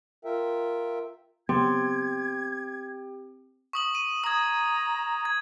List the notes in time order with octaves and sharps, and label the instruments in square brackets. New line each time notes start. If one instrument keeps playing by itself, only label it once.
[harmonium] F4 A#4 E5 G5
[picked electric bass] C#3 F#3 B3 [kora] C4 [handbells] G4 G5 [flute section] G#6
[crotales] C#6 D#6 F#7
D#7
[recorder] A#5 [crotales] D#6 G#6
[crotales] G#6